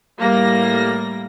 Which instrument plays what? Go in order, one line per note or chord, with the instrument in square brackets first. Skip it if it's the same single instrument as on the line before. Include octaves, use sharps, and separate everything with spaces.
[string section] A2 G3 A#3 A#6